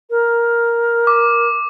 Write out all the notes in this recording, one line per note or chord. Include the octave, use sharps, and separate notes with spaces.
A#4
D6